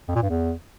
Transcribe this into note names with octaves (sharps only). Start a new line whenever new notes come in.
F2
A#2
G2
E2